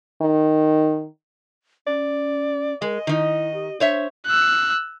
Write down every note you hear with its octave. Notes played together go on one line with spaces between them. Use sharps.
D#3
C#4 D5
G#3 A#4 D#5
D#3 D#4 E4
G4
D4 C5 C#5 E5
E6 F#6